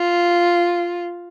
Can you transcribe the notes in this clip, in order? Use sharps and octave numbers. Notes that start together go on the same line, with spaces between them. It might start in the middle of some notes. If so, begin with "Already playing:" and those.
Already playing: F4